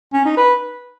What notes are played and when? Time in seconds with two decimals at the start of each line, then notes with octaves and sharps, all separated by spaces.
0.13 C#4
0.25 D#4
0.37 B4